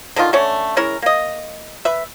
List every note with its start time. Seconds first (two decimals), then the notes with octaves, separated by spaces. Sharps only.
0.16 D3 D#3 D#4 F4
0.33 D3 A3 C#4 C#5
0.77 G#3 C#4 E4 A#4
1.02 A#3 D#5
1.85 B4 E5